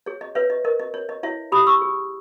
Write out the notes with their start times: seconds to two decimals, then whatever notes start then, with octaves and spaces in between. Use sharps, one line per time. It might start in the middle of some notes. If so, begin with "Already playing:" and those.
0.06 G#4 C#5
0.21 D#5
0.35 B4 C#5 E5
0.50 D#5
0.65 A#4 D#5
0.80 D#5
0.94 C#5
1.09 D#5
1.23 E4 C#5 E5
1.52 G4 B5 D#6
1.67 C#6 E6
1.81 G#4